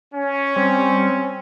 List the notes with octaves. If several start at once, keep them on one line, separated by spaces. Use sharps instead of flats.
C#4
G3 C4